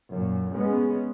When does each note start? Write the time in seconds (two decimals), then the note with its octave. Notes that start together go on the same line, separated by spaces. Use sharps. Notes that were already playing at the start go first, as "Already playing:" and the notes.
0.10 F#2 A#2
0.54 G#3 B3 C#4